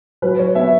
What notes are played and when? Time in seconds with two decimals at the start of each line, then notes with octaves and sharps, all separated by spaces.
0.22 F#3 B4
0.39 C#5
0.55 B3 E5